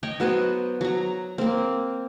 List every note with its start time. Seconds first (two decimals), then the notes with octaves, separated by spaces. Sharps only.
0.03 C#5 D#5 G5
0.20 F#3 B3 F#4 C5
0.81 F#3 A#5
1.38 A#3 C4